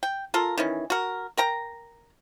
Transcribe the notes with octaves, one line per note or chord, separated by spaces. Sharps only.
G5
F4 A4 A#4
D#3 E3 C#4
F#4 A#4
A#4 G5 A#5